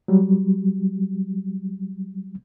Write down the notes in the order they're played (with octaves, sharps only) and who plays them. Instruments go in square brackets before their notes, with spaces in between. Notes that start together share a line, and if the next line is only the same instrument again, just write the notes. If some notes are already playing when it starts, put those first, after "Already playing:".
[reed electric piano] F#3 G3